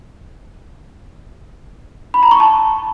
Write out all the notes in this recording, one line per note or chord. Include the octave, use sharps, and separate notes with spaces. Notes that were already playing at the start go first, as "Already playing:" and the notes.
B5
A#5
C#6
A5